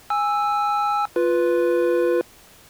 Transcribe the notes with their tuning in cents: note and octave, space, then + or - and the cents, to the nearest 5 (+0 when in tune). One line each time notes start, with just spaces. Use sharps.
G#5 -10 E6 +0
F4 +0 B4 +0